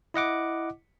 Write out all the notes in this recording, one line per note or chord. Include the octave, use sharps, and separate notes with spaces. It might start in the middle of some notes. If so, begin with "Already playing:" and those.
E4 D#5 F#5 D6